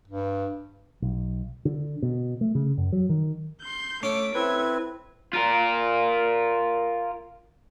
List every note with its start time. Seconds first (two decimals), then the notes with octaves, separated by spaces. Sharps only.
0.08 G2
1.02 B1
1.65 D3
2.02 B2
2.41 A3
2.55 C#3
2.78 F#2
2.92 F#3
3.09 D#3
3.62 C6 G6
4.03 A3 C#4 D6 D7
4.35 C4 E4 A4 B4 G#6
5.33 F4 A#4